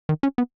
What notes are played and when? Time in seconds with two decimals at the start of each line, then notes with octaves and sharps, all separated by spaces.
0.09 D#3
0.23 C#4
0.38 B3